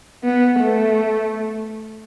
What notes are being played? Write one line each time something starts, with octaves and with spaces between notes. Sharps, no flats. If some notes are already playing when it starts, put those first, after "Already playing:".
B3
A3